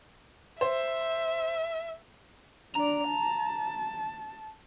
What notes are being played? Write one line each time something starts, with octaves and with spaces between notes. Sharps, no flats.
C5 E5
D4 D5 A#5
A5